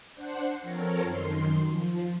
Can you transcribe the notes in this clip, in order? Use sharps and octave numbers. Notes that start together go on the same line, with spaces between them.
D4 C5 F#5
F3 C4 A4 A#4 C#5
F#2 D#3 C6
F3